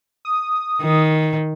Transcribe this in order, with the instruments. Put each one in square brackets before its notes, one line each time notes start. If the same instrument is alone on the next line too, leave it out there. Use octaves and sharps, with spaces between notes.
[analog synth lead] D#6
[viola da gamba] D#3